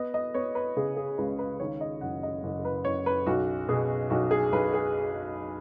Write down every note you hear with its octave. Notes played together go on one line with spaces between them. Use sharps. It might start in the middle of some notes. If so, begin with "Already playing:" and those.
Already playing: B3 D#5
D#5
B3 C#5
B4
C#3 G#4
G#4
C#2 B4
B4
D#3 C#5
D#5
F#1 F#5
D#5
F#1
B4
F#1 C#5
B4
B1 F#4
B2 G#4
B1 F#4
G#4
B1 B4
G#4